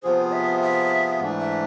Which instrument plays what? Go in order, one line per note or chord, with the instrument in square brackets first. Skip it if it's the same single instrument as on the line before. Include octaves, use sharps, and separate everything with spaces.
[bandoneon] C3 F3 B3 F4 G#4 [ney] C5
[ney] E5
E5
[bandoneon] G#2 E3 A3 D4
[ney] E5